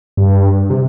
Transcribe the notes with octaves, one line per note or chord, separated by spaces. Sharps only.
G2
C3